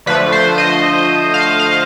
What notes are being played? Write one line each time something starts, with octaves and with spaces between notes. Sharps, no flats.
D3 F3 A3 B4
C5
D#5
F5
F5